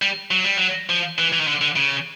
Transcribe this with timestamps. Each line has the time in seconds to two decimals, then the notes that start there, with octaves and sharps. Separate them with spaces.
0.02 G3
0.31 F#3
0.44 G3
0.57 F#3
0.89 F3
1.18 E3
1.33 E3
1.40 D#3
1.47 D3
1.61 D3
1.76 C#3